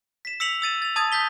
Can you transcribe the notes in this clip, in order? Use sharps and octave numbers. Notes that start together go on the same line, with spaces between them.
B6 E7
E6 B6 C#7 F7 F#7
E6 A6 D#7 E7
A6 F7
A5 D#6 G#6 A6
G6 G#6 B6 G7